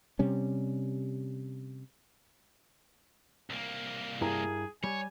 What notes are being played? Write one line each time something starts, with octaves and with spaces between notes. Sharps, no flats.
C3 G3 C#4
C2 A#3
G2 E4 G#4 A#4
G3 C#5 G#5